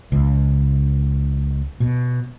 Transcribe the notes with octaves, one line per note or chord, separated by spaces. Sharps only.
C#2
B2